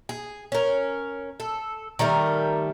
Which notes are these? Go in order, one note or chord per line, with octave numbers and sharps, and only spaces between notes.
G#4
C#4 A#4
A4
D#3 G3 A3 A#4